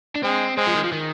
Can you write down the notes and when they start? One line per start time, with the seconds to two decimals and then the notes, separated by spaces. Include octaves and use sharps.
0.16 D4
0.23 G#3 C4
0.57 G#3 C4
0.67 F3
0.75 D#3
0.83 F3
0.92 D#3